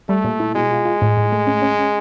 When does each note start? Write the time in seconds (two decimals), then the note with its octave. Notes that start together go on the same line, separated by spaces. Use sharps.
0.09 G3 A3
0.24 A#2
0.40 E4
0.55 B2 G#3
0.71 F4
0.85 F4
1.02 A2
1.17 A2
1.32 A3
1.47 C#4
1.62 C#4
1.79 C#4